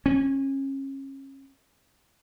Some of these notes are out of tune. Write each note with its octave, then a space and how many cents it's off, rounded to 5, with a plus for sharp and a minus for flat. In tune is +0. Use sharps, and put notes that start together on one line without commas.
C#4 -30